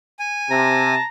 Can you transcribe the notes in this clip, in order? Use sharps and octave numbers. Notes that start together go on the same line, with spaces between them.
G#5
C3 A5 A#5